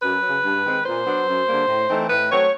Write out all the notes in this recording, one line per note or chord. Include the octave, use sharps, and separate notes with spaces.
F#2 B4
C#3 F#3
G2
D#3 G#3 C4
A#2 C5
F#3 B3 D4
F#2
D3 G3 A#3
A2
E3 A3 C4 D#4
A2 B4
F#3 A3 C4 C#5